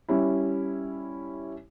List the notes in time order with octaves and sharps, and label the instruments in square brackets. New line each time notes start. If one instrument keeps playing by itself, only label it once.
[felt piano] G3 C#4 E4